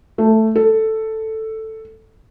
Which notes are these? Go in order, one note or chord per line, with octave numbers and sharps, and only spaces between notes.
A3
A4